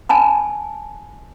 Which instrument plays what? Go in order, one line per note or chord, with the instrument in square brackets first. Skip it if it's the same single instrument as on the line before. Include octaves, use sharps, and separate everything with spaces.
[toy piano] G#5 A5 B5